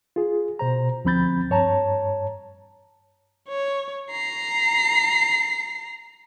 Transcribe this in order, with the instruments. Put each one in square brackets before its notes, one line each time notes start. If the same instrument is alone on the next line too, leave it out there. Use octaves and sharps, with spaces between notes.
[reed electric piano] F4 G#4
B2 C5 A#5
D2 F3 C4 B5 G6 A6
G2 C#5 A5 A#5
[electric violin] C#5
A#5 C7